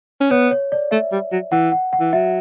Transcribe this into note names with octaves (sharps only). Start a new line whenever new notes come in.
C#4
B3 C#5
C#5
D5
A3 E5
G3
F#3
E3 F#5
F#5
F#5
E3
F#3 E5